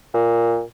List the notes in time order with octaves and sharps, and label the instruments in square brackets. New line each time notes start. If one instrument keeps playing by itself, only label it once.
[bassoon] A#2